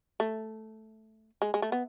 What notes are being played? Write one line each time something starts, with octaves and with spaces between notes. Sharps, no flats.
A3
G#3
G#3
A3
B3